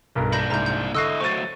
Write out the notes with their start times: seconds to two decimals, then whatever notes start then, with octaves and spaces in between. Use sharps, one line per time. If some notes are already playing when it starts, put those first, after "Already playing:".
0.15 B1 G2 A#4
0.32 A#2 D4 B5 G6 A#6
0.50 C2 G#2 A#5 G6
0.66 G6
0.95 D3 E4 D#5 C#6 E6 F#6 A#6 C7
1.21 F#3 A3 C5 C#6 A6 D#7